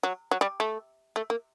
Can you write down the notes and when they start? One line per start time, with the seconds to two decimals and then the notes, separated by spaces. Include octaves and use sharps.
0.03 F#3
0.31 F#3
0.41 G3
0.60 A3
1.16 A3
1.30 A#3